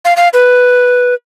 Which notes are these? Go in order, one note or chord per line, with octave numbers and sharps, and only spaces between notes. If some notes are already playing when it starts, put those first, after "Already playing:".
F5
F5
B4